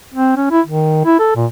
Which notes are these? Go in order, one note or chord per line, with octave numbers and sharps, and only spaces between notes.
C4
C#4
E4
D#3
E4
A4
A#2